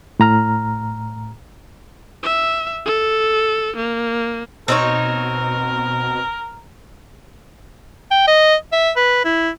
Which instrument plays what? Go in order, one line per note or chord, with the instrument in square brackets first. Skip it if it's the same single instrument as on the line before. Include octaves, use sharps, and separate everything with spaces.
[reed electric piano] A2 A#5 F6
[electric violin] E5
A4
A#3
[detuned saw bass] B2 [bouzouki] C4 D#4 C#5 [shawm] A#4
[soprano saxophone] G5
D#5
E5
B4
E4